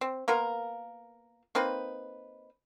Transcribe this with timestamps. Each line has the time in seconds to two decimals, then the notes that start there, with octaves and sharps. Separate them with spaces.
0.01 C4
0.28 A#3 B3 F4 A#4
1.55 A#3 C4 D#4 B4